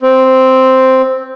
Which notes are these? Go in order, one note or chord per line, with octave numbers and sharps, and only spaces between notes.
C4